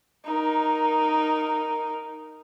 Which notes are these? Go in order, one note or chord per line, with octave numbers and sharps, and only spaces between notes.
D#4 A#4